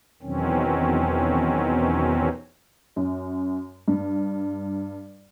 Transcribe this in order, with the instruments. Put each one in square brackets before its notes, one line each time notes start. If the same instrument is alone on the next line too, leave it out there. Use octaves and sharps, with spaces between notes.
[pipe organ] E2 B2 D#3 F#3 C4 C#4
[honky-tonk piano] F#2
G2